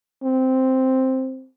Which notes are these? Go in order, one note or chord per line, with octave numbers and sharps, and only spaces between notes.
C4